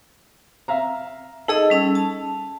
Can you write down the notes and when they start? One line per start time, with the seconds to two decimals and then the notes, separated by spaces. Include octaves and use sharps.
0.68 E5 F5 A#5
1.48 D#4 G#4 A4 D#5
1.70 G3 C#4 E6
1.95 A5